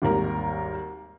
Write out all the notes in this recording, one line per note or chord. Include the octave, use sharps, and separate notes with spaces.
G#1 D#2 G3 A#4 A#5